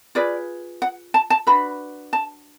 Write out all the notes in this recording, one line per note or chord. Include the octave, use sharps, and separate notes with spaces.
F4 G#4 B4 D5
F#5
A5
A5
D4 F#4 B4 B5
A5